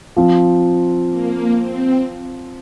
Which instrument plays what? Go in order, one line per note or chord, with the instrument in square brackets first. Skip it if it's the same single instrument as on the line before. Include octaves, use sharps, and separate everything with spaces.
[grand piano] F3 C4 F4
[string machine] A#3
C4